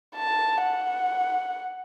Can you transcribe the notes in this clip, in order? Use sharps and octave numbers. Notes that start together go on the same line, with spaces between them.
A5
F#5